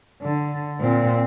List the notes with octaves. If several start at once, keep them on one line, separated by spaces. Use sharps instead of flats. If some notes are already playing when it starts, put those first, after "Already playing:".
D3
A#2 C4